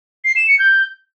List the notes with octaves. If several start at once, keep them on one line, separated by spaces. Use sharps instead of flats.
C7
E7
C#7
G6